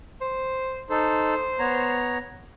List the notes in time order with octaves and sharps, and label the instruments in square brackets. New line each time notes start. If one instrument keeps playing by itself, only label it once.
[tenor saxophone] C5
[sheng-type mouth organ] D#4 A4 [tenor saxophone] C5
[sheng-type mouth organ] B3 C#5 A#5